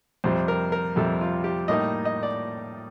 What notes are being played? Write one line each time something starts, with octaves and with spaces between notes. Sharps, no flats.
F2 C3 G3 C5
A#4
A#4
F2 C3 G3 A4
F4
G4
A2 G3 A#3 D#4 D#5
D#5
D5